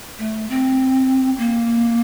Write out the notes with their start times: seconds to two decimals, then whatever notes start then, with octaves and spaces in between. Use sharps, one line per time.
0.18 A3
0.50 C4
1.38 A#3